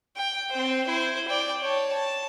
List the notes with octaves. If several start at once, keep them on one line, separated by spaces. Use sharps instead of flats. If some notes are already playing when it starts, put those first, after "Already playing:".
G5
C4 C5
E4 C5
D5 G5
C#5 A5
A5